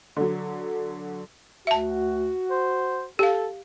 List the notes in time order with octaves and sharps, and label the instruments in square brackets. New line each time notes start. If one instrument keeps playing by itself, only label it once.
[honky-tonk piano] D3 F#3
[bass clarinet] D2 [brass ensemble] F#4 [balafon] E5 A5
[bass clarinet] C5
[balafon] G4 F5 [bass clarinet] A4